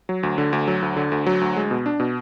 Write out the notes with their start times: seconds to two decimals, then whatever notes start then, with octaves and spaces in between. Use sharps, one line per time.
0.09 F#3
0.23 D2
0.38 D3
0.53 D2
0.68 F#3
0.82 D2
0.97 D3
1.12 D2
1.26 F#3
1.41 D2
1.57 G#3
1.71 B2
1.86 D4
2.00 B2